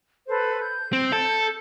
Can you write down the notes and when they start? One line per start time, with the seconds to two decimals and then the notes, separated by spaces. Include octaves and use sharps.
0.28 A4 B4 C5
0.62 G6
0.93 C4
1.13 A4